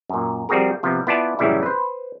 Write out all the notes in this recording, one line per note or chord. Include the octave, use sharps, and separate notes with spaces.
F#2 A#2
F3 G3 C4 F#4 G#4 A#4
C3 F3 B3
B3 E4 F4 D5 G#5 A5
F#2 A2 C#3 E3 G3 E4
B4 C5